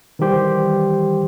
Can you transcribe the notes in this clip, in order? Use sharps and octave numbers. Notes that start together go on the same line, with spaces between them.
D#3 E3 G3 G4 C5